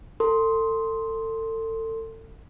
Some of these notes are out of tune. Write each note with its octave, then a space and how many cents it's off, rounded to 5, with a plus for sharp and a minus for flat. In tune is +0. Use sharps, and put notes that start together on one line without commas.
A4 +30 C6 +0